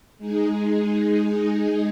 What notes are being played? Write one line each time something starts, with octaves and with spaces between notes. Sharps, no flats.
G#3 D#4 G#4